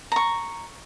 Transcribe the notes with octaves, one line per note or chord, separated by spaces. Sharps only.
A#5 C#6